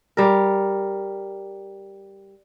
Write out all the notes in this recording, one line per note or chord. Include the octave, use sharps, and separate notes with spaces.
G3 A#4